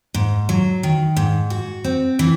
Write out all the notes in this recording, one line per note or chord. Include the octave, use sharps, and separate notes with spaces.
G#2
F#3
D#3
G#2
F#4
C4
E3